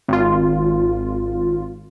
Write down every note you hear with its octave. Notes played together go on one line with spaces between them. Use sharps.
G#1 F4